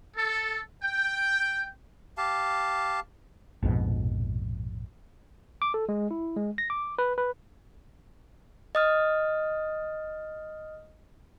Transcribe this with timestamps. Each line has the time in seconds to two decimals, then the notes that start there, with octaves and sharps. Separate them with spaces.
0.17 A4
0.82 G5
2.18 G4 F5 A5
3.63 A#1 F2 G#2 B2
5.62 D6
5.74 A4
5.89 G#3
6.11 E4
6.36 G#3
6.58 A#6
6.70 D6
6.99 B4
7.18 B4
8.75 D#5 D#6 F6